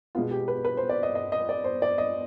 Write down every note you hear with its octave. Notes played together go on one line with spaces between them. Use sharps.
B2 G#3 B3 F4
G4
B4
B4
C5
D5
D#5
D#5
D#5
D5
C5
D5
D#5